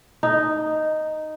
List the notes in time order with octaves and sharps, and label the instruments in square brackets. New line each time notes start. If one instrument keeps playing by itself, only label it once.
[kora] D#4